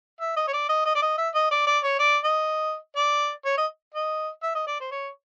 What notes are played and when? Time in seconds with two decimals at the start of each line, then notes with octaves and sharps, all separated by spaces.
0.20 E5
0.37 D#5
0.48 C#5
0.53 D5
0.69 D#5
0.85 D#5
0.95 D5
1.02 D#5
1.18 E5
1.34 D#5
1.51 D5
1.67 D5
1.83 C#5
1.99 D5
2.24 D#5
2.96 D5
3.45 C#5
3.57 D#5
3.94 D#5
4.43 E5
4.55 D#5
4.67 D5
4.80 C5
4.91 C#5